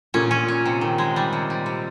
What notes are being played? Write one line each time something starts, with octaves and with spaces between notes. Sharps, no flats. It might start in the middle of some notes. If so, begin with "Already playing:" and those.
A#2 C#4
C#4
C#4
C3
D#3
G#3
G3
C3
G3
C3